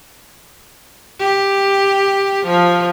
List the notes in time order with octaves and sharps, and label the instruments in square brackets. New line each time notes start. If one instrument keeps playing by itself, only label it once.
[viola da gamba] G4
F3